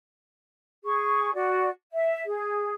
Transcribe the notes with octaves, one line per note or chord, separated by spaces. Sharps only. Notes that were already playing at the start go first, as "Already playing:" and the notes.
G#4 C#6
F#4 D5
E5
G#4